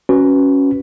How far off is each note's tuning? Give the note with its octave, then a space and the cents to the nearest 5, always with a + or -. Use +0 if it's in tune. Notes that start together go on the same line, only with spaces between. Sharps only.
C#4 +0 F#4 +0 B4 +0